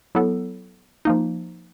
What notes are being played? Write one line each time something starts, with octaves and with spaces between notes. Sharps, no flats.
F#3 B3 E4 A4
F3 A#3 D#4